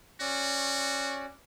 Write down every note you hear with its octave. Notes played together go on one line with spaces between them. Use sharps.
C#4 F#4 D5